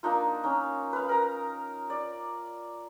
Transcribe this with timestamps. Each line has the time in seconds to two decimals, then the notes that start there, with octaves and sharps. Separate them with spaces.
0.03 A#3 D4 D#4 F4
0.44 C#4 D#4
0.93 B4 F5
1.09 A#4 A#5
1.90 D5